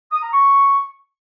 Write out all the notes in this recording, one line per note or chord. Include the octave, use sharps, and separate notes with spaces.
D#6
A#5
C#6